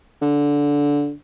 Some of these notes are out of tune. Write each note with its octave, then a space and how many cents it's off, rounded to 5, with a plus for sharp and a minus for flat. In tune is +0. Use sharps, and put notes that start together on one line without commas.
D3 -15